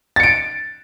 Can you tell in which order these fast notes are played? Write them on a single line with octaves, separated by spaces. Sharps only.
A6 C#7 D7